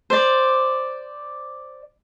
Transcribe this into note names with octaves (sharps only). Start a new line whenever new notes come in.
C5 D5